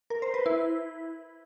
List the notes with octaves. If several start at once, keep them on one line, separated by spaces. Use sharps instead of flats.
A#4
C5
B4
E4